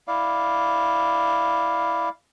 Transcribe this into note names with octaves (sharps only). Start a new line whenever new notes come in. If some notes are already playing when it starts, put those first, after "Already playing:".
E4 D5 F5